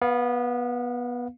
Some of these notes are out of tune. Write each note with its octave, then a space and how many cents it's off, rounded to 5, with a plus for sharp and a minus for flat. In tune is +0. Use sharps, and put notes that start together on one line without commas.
B3 -15 F5 +20